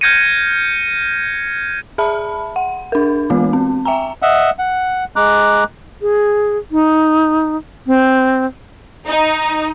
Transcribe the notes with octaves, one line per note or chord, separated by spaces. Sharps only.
F6 G6 G#6 A#6 C#7 D#7
G#4 E5 A5 B5
F#5
D4 A#4
E3 G#3 B3 F4
C4
E5 G5 G#5 A#5
D#5 E5 F#5
F#5
G#3 A#5 D6 F#6
G#4
D#4
C4
D#4